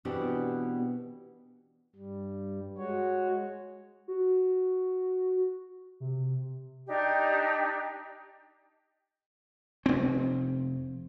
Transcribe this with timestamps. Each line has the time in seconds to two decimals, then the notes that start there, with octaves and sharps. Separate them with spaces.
0.05 B2 E3 B3 C4 D4 G4
1.96 G2 G3
2.78 G#3 F#4 C#5
4.08 F#4
6.00 C3
6.87 D4 D#4 G4
9.86 F1 C4